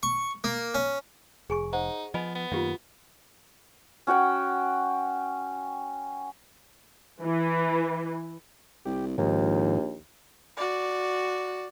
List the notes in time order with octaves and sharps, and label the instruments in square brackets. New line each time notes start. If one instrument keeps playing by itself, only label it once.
[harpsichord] C#6
A#3
C#4
[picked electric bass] F1 [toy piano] G#4 G#5 C#6
[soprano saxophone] D#4 [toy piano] C5 F#5
[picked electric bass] F3 [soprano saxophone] B3 [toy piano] D#5 G#5 B5
[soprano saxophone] B3
[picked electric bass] F#2 D#3 A#3 [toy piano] F4 G4 F5
[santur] C#4 F#4 F#5 G5
[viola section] E3
[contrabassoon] C2 [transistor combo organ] G4
[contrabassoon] A#1 [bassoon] D#2 [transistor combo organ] G#2 D#3 F3
[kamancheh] F#4 D5